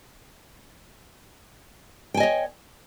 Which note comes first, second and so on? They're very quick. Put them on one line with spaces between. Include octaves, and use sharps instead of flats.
G5 G#5 D#5 C#5